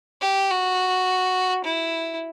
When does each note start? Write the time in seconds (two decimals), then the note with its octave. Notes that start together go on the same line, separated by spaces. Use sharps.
0.21 G4
0.50 F#4
1.64 E4